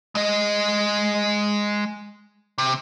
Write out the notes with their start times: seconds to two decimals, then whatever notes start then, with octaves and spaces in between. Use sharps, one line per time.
0.15 G#3 D#5
2.58 C3